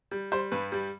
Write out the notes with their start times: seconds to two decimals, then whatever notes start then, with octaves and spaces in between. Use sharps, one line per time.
0.11 G3
0.32 G3 C5
0.52 G2 B4
0.72 G3